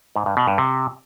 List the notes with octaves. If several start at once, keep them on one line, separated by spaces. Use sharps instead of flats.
G#2
G2
B2
G2
C3